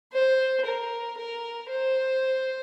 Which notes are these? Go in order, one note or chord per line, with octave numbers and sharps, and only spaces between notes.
C5
A#4
A#4
C5